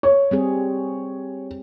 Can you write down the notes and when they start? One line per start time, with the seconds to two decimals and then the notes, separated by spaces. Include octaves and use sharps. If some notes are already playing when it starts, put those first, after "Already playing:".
0.03 C#5
0.31 G3 C4 G#4